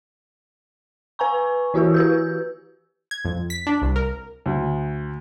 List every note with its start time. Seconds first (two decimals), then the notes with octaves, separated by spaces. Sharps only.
1.19 B4 G#5 A#5 C#6
1.74 E3 E4 F#4 G4 A#4
1.94 B4 E6 G6
3.11 G#6
3.25 F2
3.50 B6
3.67 D4
3.82 C2
3.96 A#4
4.46 D2